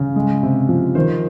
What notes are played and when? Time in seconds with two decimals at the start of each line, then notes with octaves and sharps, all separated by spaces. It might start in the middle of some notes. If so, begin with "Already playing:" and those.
Already playing: C#3
0.16 G#3
0.43 C3
0.69 F3
0.95 D#3 C5